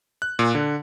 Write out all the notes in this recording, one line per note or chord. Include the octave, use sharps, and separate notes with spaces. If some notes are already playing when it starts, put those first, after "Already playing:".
F#6
A#2
D3